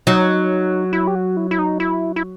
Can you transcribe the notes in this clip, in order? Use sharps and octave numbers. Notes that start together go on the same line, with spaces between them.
F#3 D#4
E4
G4
F#4
E4
E4
D#4
E4
E4